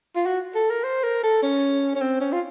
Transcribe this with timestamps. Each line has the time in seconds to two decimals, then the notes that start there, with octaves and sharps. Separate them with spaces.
0.16 F4
0.26 F#4
0.55 A4
0.70 A#4
0.84 C5
1.04 A#4
1.23 A4
1.43 C#4
1.95 C#4
2.01 C4
2.21 C#4
2.32 F4